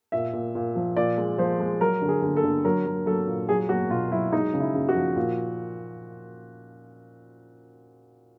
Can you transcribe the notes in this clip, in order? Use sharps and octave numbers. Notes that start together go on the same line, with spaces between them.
A#2 E5
A#2
A#2
F3
A#2 D5
G#3
F3 C5
G#3
F#3 A#4
D3
G#4
D3
A4
D3
F#3 A#4
F#3
F#3 A4
A#2
F#3 G#4
F#3 F#4
B2 F4
F#3 E4
G#3 D#4
C#3
E4
C#3
F#4
F3
A#2